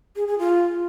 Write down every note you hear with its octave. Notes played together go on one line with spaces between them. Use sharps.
G#4
G#4
F4